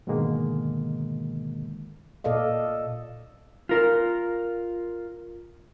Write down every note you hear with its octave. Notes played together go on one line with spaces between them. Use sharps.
G#2 B2 D3 D#3 G#3 A#3
A#2 A4 D5 D#5 F5
F4 A#4